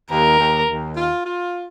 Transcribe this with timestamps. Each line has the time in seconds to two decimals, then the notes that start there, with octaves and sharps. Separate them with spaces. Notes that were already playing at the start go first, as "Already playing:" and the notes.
0.11 D#2 A#4
0.39 D#2
0.68 D#2
0.97 F4
1.25 F4